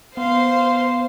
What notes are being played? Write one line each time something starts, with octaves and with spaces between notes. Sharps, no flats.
B3 C5 F5 C6 C7